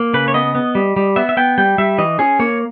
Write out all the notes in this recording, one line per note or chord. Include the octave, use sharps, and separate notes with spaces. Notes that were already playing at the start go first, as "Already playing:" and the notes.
Already playing: A#3
C#3 B4
C#5
B3 D#5
B3
G3
G3
B3 E5
E5
B3 G5
G3 G5
G3 E5
E3 D#5
C#4 G#4
A#3 C#5